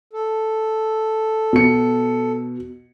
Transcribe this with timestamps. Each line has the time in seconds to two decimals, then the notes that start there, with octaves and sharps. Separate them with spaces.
0.13 A4
1.53 B2 C#7